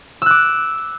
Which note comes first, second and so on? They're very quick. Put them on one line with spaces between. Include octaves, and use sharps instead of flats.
E6 F#6 D6